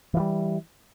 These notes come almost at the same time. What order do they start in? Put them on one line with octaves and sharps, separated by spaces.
E3 F3 G3